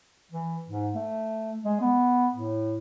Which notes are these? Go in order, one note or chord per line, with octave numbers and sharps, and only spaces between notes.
E3
G#2
A3
G#3
B3
A2